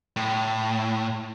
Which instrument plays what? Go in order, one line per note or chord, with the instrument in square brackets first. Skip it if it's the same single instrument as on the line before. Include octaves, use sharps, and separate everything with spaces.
[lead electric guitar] A2